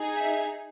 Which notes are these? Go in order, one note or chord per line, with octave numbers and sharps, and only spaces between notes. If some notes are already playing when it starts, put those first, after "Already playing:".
Already playing: D#4 G#4
E5